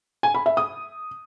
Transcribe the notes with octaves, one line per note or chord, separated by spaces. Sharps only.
G#5
B5
E5
D#6